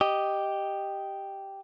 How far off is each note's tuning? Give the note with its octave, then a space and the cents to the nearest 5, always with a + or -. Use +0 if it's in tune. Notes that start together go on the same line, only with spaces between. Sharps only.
G4 +0 D#5 -5